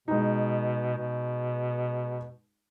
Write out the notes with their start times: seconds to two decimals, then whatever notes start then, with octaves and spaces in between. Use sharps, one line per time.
0.08 B2 G#3 D#4
0.97 B2